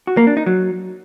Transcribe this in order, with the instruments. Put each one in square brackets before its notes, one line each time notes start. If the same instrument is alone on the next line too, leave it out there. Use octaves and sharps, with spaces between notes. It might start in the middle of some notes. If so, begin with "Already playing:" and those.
[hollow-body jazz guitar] F#4
A#3
D4
D#4
F#3